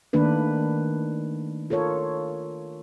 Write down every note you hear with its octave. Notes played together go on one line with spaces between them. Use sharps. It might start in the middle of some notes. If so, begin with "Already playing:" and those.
D#3 A3 A#3 D4 B4
F4 A4 A#4 C#5